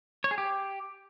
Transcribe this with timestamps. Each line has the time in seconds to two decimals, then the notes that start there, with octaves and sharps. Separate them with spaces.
0.24 C#5
0.31 G#4
0.38 G4